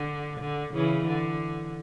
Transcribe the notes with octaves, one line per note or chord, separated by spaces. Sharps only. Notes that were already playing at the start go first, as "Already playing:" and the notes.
Already playing: D3
D3
C#3 E3
D3